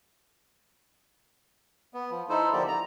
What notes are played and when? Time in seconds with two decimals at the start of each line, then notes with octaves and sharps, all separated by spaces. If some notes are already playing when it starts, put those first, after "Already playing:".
1.94 B3
2.11 F3
2.29 D#4 E4 A4 C5
2.53 D3 F3 A#3 G4 D5
2.68 A#5